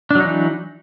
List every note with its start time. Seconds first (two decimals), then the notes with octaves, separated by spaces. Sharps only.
0.11 D4
0.15 F#3
0.20 D#4
0.25 E3